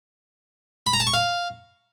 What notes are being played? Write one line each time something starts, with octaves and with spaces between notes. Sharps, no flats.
B5
A#5
A5
C#6
F5